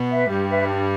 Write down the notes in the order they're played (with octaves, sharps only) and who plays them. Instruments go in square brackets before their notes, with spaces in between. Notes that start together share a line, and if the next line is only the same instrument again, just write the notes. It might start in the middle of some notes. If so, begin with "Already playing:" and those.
Already playing: [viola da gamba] B2 B3
[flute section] B4 E5
[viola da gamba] G2 G3 [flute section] G4
[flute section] B4 E5
D4